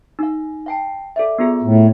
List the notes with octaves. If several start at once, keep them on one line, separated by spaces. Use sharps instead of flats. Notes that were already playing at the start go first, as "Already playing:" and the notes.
D#4 F5
F5 G5 A5
A4 D5 E5
B3 F4 G#4
A2